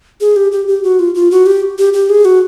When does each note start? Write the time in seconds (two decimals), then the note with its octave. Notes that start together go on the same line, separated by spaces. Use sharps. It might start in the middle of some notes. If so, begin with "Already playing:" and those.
0.21 G#4
0.36 G4
0.52 G4
0.68 G4
0.83 F#4
0.99 F4
1.15 F4
1.31 F#4
1.46 G4
1.78 G4
1.93 G4
2.09 G#4
2.25 F#4